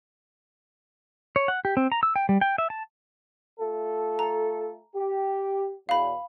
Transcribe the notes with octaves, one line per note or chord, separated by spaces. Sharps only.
C#5
F#5
G4
C4
A#5
E6
G5
G3
G5
E5
A5
A3 F4 A4
A#5
G4
E2 B2 F5 B5